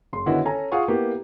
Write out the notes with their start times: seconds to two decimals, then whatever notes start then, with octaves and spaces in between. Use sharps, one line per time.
0.13 F#1 C6
0.26 D3 D#3 B3 C#4 E4 F#4
0.45 C#4 A4 G#5 A#5
0.72 F4 G#4 F5 F#5 G#5 C#6
0.88 A#3 B3 E4 G4